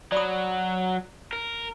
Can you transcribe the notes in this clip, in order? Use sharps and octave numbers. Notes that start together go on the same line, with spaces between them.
F#3 D5 B5 D#6
A#4